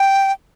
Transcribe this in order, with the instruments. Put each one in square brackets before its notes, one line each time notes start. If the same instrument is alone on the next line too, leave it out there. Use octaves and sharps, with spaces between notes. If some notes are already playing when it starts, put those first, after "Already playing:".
Already playing: [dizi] G5